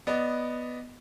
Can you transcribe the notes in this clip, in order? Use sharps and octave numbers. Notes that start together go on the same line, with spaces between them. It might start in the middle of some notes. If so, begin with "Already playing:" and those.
B3 D5 D#5